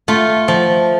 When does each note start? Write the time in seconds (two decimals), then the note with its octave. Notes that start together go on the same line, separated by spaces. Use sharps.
0.08 A3 F4
0.48 F3